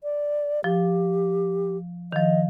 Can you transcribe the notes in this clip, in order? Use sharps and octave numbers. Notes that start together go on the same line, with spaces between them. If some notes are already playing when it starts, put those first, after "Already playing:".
D5
F3 G4
D#3 F3 D#5